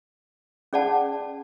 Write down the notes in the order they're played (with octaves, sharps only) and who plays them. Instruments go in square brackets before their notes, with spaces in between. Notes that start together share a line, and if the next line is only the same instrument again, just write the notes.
[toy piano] C#4 G#4 D5 F#5 A5